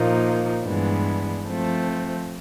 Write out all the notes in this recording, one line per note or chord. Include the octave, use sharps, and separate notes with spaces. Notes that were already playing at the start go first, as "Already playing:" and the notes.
Already playing: A#2 F3 A#3 D#4
G2 E3 G#3 B3 D4
F3 A3 C4